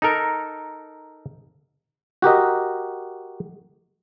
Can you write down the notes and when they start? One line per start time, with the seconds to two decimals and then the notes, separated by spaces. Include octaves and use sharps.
0.02 D#4 A4 A#4
2.22 F#4 G4 A#4 D#5